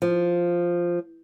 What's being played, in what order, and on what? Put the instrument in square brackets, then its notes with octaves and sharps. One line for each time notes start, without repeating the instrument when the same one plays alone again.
[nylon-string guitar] F3